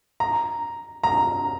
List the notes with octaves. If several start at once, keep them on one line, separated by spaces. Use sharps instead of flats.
A#5
A#5